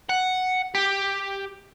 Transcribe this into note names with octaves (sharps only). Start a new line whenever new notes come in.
F#5
G4